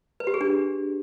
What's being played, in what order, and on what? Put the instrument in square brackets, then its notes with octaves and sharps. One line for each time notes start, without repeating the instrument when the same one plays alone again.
[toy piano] B4
G4
G#4
D4